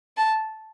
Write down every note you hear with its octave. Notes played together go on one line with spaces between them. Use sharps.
A5